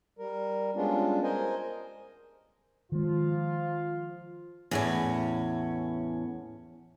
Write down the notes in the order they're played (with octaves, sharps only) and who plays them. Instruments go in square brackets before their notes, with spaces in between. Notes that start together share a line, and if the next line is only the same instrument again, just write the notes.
[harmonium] G3 A#4
G3 G#3 B3 C#4 D4 F4
A#4 C5 D#5 G#5
[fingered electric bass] D#3 G#3 [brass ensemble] F3 F4
[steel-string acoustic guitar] E2 A2 C#4